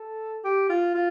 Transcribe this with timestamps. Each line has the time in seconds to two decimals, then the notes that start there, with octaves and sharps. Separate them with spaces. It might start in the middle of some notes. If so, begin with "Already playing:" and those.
Already playing: A4
0.44 G4
0.69 F4
0.95 F4